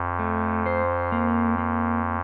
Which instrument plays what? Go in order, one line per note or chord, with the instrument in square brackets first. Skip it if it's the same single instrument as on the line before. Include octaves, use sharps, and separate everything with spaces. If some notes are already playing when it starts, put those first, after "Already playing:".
Already playing: [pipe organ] F2
[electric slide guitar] A3
C5
A#3
A#3